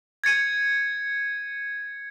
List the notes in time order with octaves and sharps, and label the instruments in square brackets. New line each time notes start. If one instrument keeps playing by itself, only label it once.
[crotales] G#6 A6 C#7 D#7